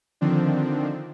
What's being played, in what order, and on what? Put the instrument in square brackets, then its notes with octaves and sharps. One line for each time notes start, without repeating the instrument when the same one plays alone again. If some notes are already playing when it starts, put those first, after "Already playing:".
[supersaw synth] D3 D#3 F3 C4 D4